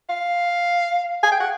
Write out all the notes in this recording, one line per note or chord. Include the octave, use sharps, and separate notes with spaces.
F5
G#5
G5
F#5